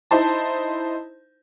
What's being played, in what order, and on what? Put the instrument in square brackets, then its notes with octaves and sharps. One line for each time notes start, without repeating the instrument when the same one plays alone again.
[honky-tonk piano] D#4 E4 C5 A5